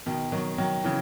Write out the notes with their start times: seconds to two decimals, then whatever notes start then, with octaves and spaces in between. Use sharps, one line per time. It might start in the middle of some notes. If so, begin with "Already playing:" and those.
0.06 B2 D#3
0.32 D#3 F#3
0.58 D#3 F#3
0.84 C#3 E3